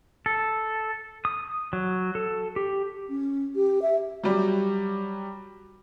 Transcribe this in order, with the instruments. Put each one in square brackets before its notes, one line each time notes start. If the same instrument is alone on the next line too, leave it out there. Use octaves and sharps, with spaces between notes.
[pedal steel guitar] A4
D#6
F#3
A4
G4
[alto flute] C#4
G4
E5
[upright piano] F#3 G3